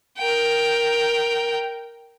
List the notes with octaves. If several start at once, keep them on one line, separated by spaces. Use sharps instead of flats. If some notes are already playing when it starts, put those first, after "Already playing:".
A#4 G5